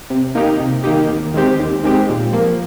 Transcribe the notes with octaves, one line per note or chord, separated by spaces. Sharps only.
C3
D#3 A#3 D#4 G4
C3
D#3 A#3 D#4 G4
D#2
D#3 G#3 C4 G4
D#2
D#3 G#3 C4 G4
A#2
F3 A#3